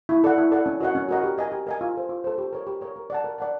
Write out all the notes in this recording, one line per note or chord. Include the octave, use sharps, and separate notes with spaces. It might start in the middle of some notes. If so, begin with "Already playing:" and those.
E4
A4 D5 F#5
E4
A4 D5 F#5
C#4
F#4 A#4 D#5 F#5
C#4
F#4 A#4 D#5 F#5
G4
A#4 D#5 G#5
G4
A#4 D#5 G#5
F4
A4 C5
F4
A4 C5
G4
A#4 C#5
G4
A#4 C#5
A#4
D5 F#5 A5
A#4
D5 F#5 A5